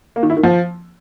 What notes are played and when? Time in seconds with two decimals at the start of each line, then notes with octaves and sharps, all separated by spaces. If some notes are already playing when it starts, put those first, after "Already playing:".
0.16 A#3
0.23 D#3
0.30 E4
0.37 D#3
0.43 F3